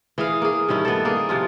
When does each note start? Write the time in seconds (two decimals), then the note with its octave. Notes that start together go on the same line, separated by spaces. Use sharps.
0.18 E3 G#4 F5
0.42 A#3 G#4
0.68 G2 D#3 C#4 E4
0.85 B3 A4
1.05 A#3 G#4
1.29 C3 F3 F4